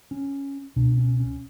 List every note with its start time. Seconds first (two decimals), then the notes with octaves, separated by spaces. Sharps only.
0.11 C#4
0.76 C#2 B2 D4
0.97 C#4
1.20 C#4